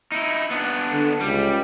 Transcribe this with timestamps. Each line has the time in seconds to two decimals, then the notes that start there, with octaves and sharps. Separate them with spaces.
0.12 D#4 E4
0.51 B3 D4
0.92 D3
1.21 C#2 G3